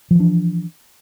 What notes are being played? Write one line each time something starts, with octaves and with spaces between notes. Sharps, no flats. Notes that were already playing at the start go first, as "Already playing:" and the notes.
E3 F3 D4